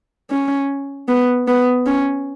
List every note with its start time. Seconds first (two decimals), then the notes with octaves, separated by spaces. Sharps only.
0.31 C#4
1.08 B3
1.48 B3
1.86 C#4